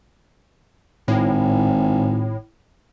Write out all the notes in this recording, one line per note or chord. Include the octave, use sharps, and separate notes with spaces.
G#1 A2